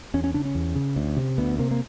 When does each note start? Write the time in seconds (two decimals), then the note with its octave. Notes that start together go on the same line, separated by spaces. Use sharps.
0.14 E2 C#4
0.24 C#4
0.34 C#3 D4
0.45 C#4
0.55 E2
0.75 C#3
0.96 D2
1.17 C3
1.38 D2 B3
1.59 C3 A#3
1.71 A#3